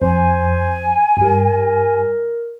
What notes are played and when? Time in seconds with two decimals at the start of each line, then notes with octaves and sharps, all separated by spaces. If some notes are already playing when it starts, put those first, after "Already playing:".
0.02 F2 C5 G#5
1.17 G2 G3 A#4